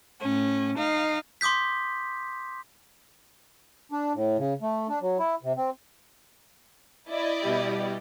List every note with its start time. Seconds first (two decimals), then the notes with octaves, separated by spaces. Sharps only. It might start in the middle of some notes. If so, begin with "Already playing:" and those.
0.20 A2 C#4
0.76 D#4 F5
1.41 C6 D6 D#6 G6 B6
3.92 D4
4.14 A2
4.38 C#3
4.62 A3
4.89 D4
5.01 F#3
5.19 E4
5.43 C3
5.56 C4
7.09 E4 D5 D#5
7.41 B2 G3 G4